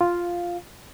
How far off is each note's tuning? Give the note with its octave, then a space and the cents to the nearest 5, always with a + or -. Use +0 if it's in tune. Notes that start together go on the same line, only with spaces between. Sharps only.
F4 +0 F5 +0